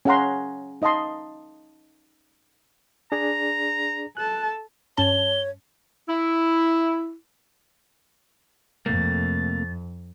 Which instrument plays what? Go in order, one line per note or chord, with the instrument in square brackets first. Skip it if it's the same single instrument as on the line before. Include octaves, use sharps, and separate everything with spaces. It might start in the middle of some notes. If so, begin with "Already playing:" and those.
[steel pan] C#4 G#4 F5 F#5 A#5 C6
D#4 D#5 F5 A5 C6
[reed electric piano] D4 G#4 D5 [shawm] A#5
[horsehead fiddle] A4 A5 [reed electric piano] F#6
[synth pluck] G2 C#4 A5 [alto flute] C#5 [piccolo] G7
[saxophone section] E4
[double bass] F2 [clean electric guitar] C3 A3 A#3 [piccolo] A6